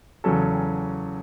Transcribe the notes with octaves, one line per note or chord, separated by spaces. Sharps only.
E2 C#3 F#3 C#4 A4